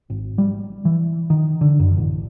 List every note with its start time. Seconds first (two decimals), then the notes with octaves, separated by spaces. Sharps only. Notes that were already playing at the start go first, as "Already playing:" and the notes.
0.10 G#1
0.38 G3
0.85 E3
1.30 D#3
1.61 D3
1.80 F#2
1.97 A1